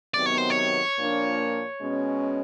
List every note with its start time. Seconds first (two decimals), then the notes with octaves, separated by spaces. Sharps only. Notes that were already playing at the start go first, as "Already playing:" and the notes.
0.14 C3 D#3 F#3 B3 D5
0.26 C#5
0.38 C5
0.50 C#5
0.98 A#2 F3 A#3 D4
1.81 B2 G#3 C#4